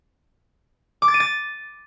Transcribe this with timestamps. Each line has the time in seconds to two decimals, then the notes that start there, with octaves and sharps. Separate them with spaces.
1.02 D6
1.08 A6
1.14 D#7
1.20 A6